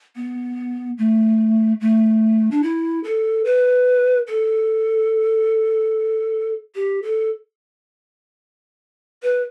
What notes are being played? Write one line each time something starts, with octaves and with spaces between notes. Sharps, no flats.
B3
A3
A3
D4
E4
A4
B4
A4
G4
A4
B4